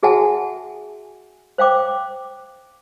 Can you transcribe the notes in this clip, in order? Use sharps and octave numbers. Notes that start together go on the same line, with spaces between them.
F#4 G#4 E5 F#5 G#5 A5
C5 F5 G5 D6